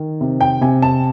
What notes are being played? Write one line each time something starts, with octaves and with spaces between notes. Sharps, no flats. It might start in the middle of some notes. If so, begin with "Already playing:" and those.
Already playing: D#3
C3
G5
C3 G#5
A5